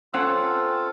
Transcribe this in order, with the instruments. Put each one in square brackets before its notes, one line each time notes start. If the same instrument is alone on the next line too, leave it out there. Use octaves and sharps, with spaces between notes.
[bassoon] C4 [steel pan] C#4 F#5 E6 [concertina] F4 A4